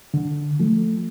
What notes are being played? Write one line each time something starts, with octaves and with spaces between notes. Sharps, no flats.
D3
F3 A3